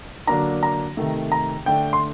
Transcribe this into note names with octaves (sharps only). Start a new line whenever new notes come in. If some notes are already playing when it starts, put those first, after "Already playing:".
D3 F#3 A#3 D4 A#5
A#5
C3 D#3 A3
A#5
D3 A3 D4 G5
C6